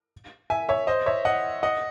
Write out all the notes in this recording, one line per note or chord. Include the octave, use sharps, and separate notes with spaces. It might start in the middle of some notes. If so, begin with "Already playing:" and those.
E5 G#5
C#5 E5
C5 D#5
C#5 E5
D#5 F#5
D#5 F#5